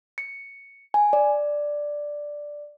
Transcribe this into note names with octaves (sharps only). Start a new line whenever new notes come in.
C#7
G#5
D5